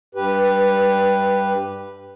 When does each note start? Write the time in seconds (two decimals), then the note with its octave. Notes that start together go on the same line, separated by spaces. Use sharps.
0.15 G2 G4 B4